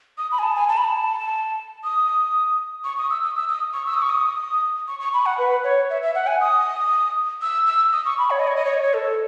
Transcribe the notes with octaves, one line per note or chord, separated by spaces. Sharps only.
D#6
B5
G#5
A5
G#5
A5
B5
A5
D#6
C#6
D#6
E6
D#6
E6
D#6
C#6
E6
D#6
C#6
D#6
C#6
C#6
B5
F#5
B4
C#5
E5
E5
F#5
G#5
D#6
E6
E6
D#6
C#6
B5
C#5
D#5
C#5
D#5
C#5
D#5
C#5
A4